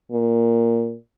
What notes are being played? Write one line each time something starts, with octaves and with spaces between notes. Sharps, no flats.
A#2